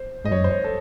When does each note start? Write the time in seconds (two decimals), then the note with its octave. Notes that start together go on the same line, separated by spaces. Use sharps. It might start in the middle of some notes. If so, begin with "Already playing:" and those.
Already playing: C5
0.25 G#2 D#5
0.31 F#2 C#5
0.44 C5
0.51 C#5
0.64 A4